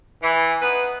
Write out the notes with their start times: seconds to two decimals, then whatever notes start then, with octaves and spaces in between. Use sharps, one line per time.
0.23 E3
0.61 B3 D#4 B4